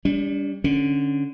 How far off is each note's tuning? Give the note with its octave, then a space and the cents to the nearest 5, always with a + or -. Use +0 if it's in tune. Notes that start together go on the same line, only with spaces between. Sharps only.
G3 +25 D4 -40
D3 +0 C#4 +0